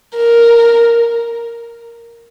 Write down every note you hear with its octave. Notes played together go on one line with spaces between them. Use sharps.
A#4